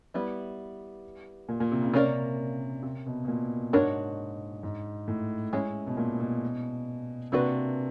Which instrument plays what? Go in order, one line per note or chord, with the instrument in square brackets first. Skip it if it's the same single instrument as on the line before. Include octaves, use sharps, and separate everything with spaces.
[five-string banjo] G3 B3 E4
[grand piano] A#2
A#2
C3
C#3
[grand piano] C3 [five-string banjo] A#3 C#4 F#4 A#4 D5
[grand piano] C3
B2
B2
A#2
[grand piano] G#2 [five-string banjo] D4 F#4 A#4 C#5
[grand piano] G#2
A2
[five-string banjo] G#3 C#4 E4
[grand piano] B2
A#2
B2
[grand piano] C3 [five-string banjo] A#3 D4 F#4 B4